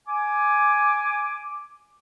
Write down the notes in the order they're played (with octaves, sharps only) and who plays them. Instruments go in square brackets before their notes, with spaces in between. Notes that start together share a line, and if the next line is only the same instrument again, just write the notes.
[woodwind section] G#5 D6